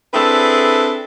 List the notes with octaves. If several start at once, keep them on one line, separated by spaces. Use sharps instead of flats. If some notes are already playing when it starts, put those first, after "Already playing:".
C4 D4 E4 G#4 A4 B4